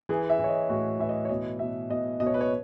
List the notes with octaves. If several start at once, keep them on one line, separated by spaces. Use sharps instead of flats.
E3 G#4
E5
E3 C#5
D#5
A2 F#4
E3 E5
D#5
C#5
B2 D#5
B2 E5
B2 D#5
B2 D#5
C#5
B4
C#5